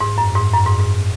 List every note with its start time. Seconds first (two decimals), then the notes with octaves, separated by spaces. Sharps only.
0.01 G#2
0.18 F#2
0.35 G#2
0.53 F#2
0.66 G#2
0.80 G#2